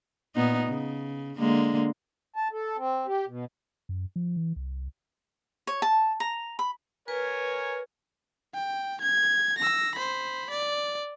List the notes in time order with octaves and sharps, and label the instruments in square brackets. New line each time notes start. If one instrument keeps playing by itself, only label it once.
[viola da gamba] A#2 B3 D#4
C#3
D3 G#3 A#3
[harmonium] A5
A4
C4
G4
B2
[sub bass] F#2
F3
E3
C2
[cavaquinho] C#5
A5
A#5
B5
[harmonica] A#4 G#5 [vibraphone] B4 [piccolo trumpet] C#5
[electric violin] G5
G#6
E6 A#6
C5 B5
D5